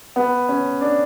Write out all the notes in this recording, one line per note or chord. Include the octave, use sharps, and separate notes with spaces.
B3
C#4
D4